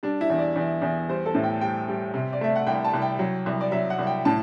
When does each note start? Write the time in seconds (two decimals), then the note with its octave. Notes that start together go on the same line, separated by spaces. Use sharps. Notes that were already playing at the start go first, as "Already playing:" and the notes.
0.03 G3 D4
0.21 E4
0.30 E2
0.39 D5
0.56 E2
0.82 E2
1.09 G3 C5
1.26 A4
1.35 A2
1.44 G5
1.61 G3 G5
1.88 G3
2.14 C3
2.33 D5
2.41 A3 E5
2.56 F#5
2.67 C2 G5
2.85 A5
2.94 C2
3.02 G5
3.19 F#3
3.46 C2
3.61 D5
3.72 F#3 E5
3.90 F#5
3.99 C2
4.07 G5
4.25 A2 A5